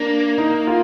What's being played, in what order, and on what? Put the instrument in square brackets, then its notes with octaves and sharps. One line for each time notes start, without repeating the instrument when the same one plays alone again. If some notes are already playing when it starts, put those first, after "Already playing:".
Already playing: [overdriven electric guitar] A#3 [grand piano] D4
[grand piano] D#4
F4